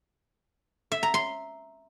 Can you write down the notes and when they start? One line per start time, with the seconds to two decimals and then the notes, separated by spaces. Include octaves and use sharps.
0.92 E5
1.03 A#5
1.14 C6